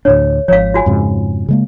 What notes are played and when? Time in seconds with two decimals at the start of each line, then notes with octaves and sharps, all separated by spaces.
0.05 D2 A2 D4 C#5
0.48 G#1 F3 C#5 F5
0.74 F4 F#4 G#5
0.86 F2 G#2 C#3
1.48 C#3 G#3 A#3